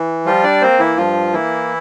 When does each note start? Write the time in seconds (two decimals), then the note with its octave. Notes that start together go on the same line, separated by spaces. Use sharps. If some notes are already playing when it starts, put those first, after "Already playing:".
Already playing: E3
0.25 F3 G3 F4
0.44 D4 D5
0.61 A#3 C4 C5
0.79 E3 E4
0.97 G2 F3 F4
1.33 E3 A#3 E4